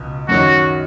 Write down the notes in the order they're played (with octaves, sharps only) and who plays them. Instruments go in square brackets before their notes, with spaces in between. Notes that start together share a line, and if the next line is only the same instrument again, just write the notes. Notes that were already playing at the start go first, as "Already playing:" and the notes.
Already playing: [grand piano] C#2 B2
[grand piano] F#2 D#3 F#3 [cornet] F#4